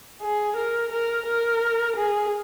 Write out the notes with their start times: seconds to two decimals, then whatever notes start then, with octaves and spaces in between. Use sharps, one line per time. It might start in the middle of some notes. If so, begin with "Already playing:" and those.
0.22 G#4
0.57 A#4
0.92 A#4
1.26 A#4
1.96 G#4